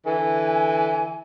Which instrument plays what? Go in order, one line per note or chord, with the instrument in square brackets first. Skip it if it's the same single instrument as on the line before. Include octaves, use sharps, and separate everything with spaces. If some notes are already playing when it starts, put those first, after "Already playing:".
[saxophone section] D3 E3 [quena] G#5